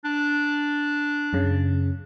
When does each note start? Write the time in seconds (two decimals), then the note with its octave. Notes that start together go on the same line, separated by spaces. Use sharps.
0.04 D4
1.33 F#2 C#3